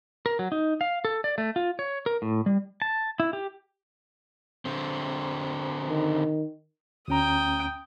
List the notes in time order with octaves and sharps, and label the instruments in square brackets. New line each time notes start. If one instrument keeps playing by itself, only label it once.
[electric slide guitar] A#4
F#3
D#4
F5
A4
D5
A3
F4
C#5
A#4
A2
G3
[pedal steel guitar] A5
E4
G4
[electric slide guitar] D3 C4
[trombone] D#3
[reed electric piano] D2 C#4 A#5 [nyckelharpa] G5 D#6